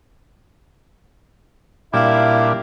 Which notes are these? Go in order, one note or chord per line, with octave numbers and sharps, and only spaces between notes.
A#2 G3 D4 E4 E5 F5